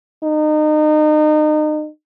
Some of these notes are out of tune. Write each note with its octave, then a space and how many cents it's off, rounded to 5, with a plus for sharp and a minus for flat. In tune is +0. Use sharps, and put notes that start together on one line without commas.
D#4 -30